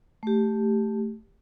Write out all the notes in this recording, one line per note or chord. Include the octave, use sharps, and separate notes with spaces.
A3 G4